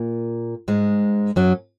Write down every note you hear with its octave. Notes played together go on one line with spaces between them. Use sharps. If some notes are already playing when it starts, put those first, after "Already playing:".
Already playing: A#2 A#3
G#2 G#3
F#2 F#3